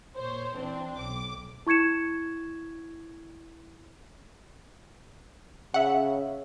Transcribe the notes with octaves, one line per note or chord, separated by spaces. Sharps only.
A#2 C5 C#5
E3 C4 D4
B1 D6
E4 C#6 G#6 C#7 E7
C#3 C#5 E5 F#5